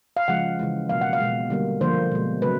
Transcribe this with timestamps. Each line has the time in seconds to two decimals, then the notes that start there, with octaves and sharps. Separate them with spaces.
0.17 F5
0.28 C#3 F3 G#3 F#5
0.59 C#3 E3 G#3
0.89 B2 F#3 A#3 F5
1.01 F#5
1.13 F5
1.20 B2 G#3
1.50 D3 G3 A#3
1.81 D3 F3 A#3 C5
2.12 B2 G#3
2.42 C#3 F#3 A3 B4